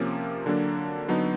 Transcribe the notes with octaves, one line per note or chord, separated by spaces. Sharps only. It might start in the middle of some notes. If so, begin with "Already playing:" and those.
Already playing: C3 F3 A#3 C#4
D3 F#3 A#3 D4
D3 F#3 B3 D#4